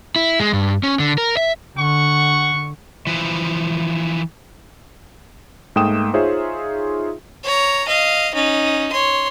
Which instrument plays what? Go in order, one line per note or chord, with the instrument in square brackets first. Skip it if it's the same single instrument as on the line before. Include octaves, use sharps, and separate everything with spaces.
[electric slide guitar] E4
G#3
G2
C#4
D3
A#4
E5
[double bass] D3 [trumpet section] F#5 C#6
[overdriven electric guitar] E3 F3
[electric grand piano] G#2 A3 A#3 G5 D#6 E7
D#4 F4 G#4 C5 C#5 E5
[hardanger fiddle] C#5 A#5
D#5 F5
C#4 D#4
C#5 C6